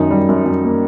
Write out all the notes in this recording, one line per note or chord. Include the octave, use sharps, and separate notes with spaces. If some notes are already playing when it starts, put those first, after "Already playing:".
Already playing: F#2 D#3 D#4
G3
F#2
F#2
A#3